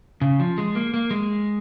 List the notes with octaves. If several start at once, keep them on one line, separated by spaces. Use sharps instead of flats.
C#3
F3
G#3
A#3
A#3
G#3